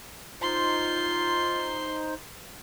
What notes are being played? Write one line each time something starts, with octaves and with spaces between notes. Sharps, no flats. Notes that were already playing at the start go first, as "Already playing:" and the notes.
D#4 F4 C5 C6